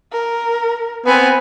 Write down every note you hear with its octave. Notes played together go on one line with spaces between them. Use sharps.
A#4
B3 C4 G#5